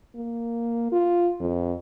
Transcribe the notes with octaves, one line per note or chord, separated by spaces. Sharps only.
A#3
F4
F2